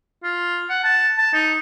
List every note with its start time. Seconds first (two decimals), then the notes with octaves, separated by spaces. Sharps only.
0.23 F4
0.69 F#5
0.84 A5
1.18 A5
1.33 D#4